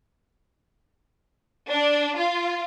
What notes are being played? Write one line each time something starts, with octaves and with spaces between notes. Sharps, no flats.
D4
F4